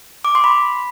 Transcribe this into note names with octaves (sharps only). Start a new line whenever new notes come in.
D6
C6
B5